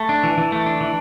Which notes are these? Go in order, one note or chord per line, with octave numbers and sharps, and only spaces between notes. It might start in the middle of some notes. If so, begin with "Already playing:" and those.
Already playing: A3
D4
E3
E3
A3
D4
E3